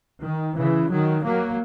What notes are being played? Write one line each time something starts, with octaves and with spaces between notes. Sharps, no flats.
D#3
C#3 E3
D#3 F#3
F#3 A#3